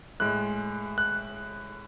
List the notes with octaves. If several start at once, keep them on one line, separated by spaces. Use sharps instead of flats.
A2 G#3 F#6
F#6